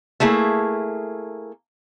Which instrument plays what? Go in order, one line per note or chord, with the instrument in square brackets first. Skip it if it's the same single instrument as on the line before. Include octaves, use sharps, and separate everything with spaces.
[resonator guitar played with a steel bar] A3 A#3 E4 G#4